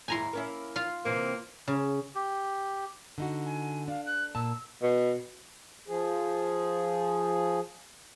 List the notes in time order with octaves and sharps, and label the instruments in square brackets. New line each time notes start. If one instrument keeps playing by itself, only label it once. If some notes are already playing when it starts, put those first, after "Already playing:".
[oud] D#2 G#2 E4 [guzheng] G#5 A#5 C6
[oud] A#3 C#4 E4
[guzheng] F4 F5
[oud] C3 E3 C4 [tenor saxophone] A#3
[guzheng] C#3
[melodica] G4
[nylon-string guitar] D3 D#4 F#4
[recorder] G#5
[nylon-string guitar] D4 [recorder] F5
[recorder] F#6
[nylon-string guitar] A#2 A5 [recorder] E6
[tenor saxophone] B2
[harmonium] F3 G#4